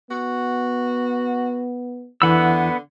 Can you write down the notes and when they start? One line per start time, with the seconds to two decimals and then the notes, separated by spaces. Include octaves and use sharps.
0.11 B3 F#4
2.22 E2 D3 E3 B3 F#5 B5 E6